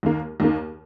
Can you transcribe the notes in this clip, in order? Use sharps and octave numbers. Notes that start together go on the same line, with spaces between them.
D#2 D#3 A#3
D#2 D#3 A#3